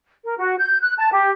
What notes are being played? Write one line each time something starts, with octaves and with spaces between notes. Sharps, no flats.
A#4
F#4
G6
F#6
A5
G4